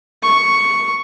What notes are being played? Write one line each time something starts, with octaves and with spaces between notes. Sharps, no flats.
C#6